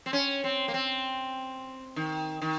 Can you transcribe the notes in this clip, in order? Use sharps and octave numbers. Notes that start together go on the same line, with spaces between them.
C4
C#4
C4
A#3
C4
D#3
D#3